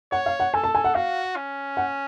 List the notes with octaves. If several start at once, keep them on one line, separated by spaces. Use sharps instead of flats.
C#5 F#5
F5
F#5
A4 G#5
A5
G#5
F#5
F#4 F5
C#4
F#5